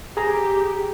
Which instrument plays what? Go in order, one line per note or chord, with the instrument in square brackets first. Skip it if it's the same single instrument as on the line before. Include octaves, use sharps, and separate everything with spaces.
[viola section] G4 [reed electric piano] G#4 A#5